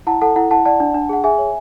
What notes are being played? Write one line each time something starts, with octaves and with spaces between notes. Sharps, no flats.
E4 F#5 A5
A4 F#5 A5
E4 F#5
E4 F#5 A5
D5 F#5 A5
D4
D4
G#4 F#5
G#4 E5 G#5
C#5